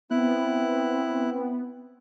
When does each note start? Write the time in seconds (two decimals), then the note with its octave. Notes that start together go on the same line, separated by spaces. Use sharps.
0.11 B3 C4 E4 F#6